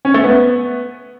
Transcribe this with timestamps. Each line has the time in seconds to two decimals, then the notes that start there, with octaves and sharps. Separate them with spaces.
0.05 C#4
0.14 A3
0.24 B3